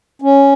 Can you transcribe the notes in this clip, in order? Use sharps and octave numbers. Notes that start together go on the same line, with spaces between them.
C#4